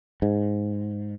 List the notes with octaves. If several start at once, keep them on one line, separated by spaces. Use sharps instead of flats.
G#2